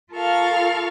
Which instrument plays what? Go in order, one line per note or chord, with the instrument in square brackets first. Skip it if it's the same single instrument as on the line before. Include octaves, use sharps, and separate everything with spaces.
[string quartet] F4 A4 A#4 F5 C#6